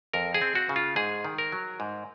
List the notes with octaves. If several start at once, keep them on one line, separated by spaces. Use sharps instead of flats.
F2 A#4
G#4
C4
F#4
C#3
F4
G#2 G#4
D#3
A#4
F#3
G#2